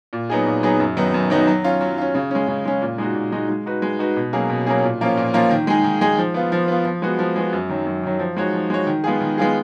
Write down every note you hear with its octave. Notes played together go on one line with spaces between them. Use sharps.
A#2
F#3 B3 D#4 G#4
A#2
F#3 B3 D#4 G#4
F#2
D#3 F#3 B3 D#4
F#2
D#3 F#3 B3 D#4
F#3
C#4 F4
F#3
C#4 F4
C#3
G#3 C#4
C#3
G#3 C#4
A#2
G#3 D#4 F#4
A#2
G#3 D#4 F#4
G#3
D#4 F#4 B4
G#3
D#4 F#4 B4
B2
F#3 A#3 C#4 G#4
B2
F#3 A#3 C#4 G#4
A#2
F3 A#3 C#4 F4
A#2
F3 A#3 C#4 F4
D#3
G#3 D#4 G#4
D#3
G#3 D#4 G#4
F3
B3 F4
F3
B3 F4
F3
G#3 B3 F#4
F3
G#3 B3 F#4
F#2
D#3 F#3
F#2
D#3 F#3
F3
G#3 D#4 F#4 C#5
F3
G#3 D#4 F#4 C#5
D#3
G#3 B3 F4 G#4
D#3
G#3 B3 F4 G#4